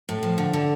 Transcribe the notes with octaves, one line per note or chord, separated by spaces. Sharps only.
A2
F3
D3
D3